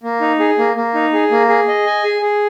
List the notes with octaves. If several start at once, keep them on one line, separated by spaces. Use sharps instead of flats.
A#3
D#4
G#4
A#3
A#3
D#4
G#4
A#3
G#4
D#5
G#5
G#4
G#4